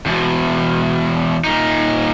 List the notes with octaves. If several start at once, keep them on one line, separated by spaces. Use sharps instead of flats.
E2 B2
A#2 D#4